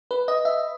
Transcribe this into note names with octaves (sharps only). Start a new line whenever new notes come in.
B4
D#5
E5